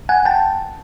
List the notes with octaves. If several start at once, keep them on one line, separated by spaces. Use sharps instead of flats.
F#5 G#5
G5 A5